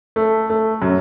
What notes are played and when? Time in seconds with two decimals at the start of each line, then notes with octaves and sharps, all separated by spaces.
0.16 A3
0.50 A3
0.82 F#2